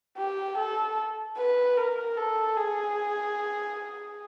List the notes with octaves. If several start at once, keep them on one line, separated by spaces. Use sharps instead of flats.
G4
A4
B4
A#4
A4
G#4